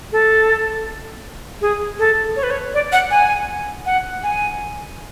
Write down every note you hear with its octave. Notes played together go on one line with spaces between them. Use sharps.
A4
G#4
A4
C#5
B4
C#5
D5
F#5
G#5
F#5
G#5